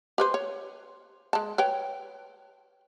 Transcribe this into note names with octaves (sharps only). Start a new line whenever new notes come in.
G4 B4 C5
C#5
G#3 A5
B4 C#5 G5